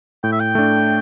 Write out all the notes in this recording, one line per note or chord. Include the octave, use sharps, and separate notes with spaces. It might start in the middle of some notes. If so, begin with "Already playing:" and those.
A2 G5
E5
G5
A3 D4